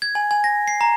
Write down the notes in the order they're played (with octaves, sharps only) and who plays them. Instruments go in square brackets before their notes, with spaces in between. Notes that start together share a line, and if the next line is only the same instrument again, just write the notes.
[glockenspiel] G#6
G#5
G#5
A#6
C7
A#5